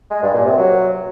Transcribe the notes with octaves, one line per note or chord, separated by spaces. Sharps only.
G#3
G2
A#2
C3
F#3